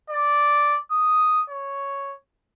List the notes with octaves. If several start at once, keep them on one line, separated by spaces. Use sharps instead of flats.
D5
D#6
C#5